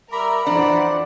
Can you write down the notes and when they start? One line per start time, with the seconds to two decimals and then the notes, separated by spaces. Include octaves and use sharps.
0.12 G3 A#4 E5 A#5 B5 D6
0.47 F2 E3 D4 C5 D5 F#5